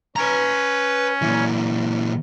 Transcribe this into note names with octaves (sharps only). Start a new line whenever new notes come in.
C#4 B4 A#5
A#2 E3